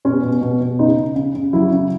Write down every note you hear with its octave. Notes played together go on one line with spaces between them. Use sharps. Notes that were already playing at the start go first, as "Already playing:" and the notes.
B2 C#4
B2
B2
B2
C#3 D#4
C#3
C#3
C#3
F#3 E4
C#3